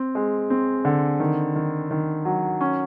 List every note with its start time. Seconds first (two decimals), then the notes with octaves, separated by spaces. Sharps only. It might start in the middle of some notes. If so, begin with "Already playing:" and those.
Already playing: C4
0.15 G#3
0.50 C4
0.85 D3
1.20 D#3
1.55 D#3
1.91 D#3
2.25 F#3
2.61 C#4